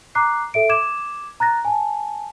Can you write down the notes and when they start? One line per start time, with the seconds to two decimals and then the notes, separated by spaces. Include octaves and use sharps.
0.15 A#5 D6 F#6 C7
0.54 A4 E5 D7
0.69 D6 G#6 E7
1.40 A#5 F#6 A6 A#6
1.65 G#5 A5